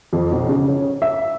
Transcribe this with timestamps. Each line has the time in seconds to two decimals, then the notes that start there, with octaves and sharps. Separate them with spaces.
0.13 F2
0.32 B1
0.49 C#3
0.68 C#5
1.02 E5